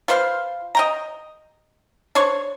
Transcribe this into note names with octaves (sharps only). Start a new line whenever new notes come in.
F4 B4 C5 F5
D#5 G5 A#5
D4 C5 C#5 C#6